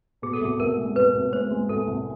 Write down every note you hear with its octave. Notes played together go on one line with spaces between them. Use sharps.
B2 G#4
A4
C2 G#4
C2 A#4
G#3
C2 B4
C2
G#3 C5
G#3
C2 A4
C2